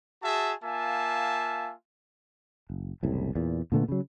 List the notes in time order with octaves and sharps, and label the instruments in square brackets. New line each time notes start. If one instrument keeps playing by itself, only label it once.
[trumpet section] F#4 G#4 E5 A5
A#3 F4 E5 G#5 A5
[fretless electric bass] F#1
F#1 C2 A2
E2 A#2
A#2 D3 A3 B3
C#3 F#3